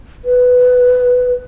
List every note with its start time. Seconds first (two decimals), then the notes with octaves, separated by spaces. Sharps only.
0.25 B4